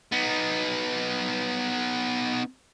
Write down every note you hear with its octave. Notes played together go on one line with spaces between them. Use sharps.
B3 D#4